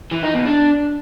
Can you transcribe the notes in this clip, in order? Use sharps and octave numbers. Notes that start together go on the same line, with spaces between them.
E3
D#4
B2
D4